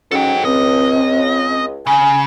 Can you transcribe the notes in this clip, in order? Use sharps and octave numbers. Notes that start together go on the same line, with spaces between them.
G#2 F#3 C#4 A4 G5
C#2 C4 D#5
C#3 G#5